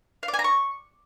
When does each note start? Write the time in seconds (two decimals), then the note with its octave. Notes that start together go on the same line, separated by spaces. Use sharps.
0.23 F5
0.28 D5
0.34 G#5
0.39 A#5
0.44 C#6